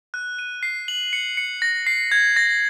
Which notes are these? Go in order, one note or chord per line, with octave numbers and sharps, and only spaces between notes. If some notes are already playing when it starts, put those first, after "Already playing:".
F#6
D#7
C7
F#7
C#7
C#7
A#6
C7
G#6
A#6